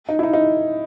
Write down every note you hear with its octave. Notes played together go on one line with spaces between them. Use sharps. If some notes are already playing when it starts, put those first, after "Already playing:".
D#4
E4
D#4
D#4